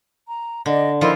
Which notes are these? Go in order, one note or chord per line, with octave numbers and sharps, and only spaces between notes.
A#5
D3 D5 D#5
D#3 F3 E4 F4 D#5 C6